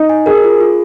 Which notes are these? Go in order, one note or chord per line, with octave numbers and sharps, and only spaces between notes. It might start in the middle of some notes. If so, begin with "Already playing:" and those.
Already playing: D#4
G#5
G#4 A#4
F4
F4